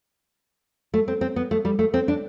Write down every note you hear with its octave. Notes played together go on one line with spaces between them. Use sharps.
A3
C4
C4
B3
A3
G3
A3
C4
D4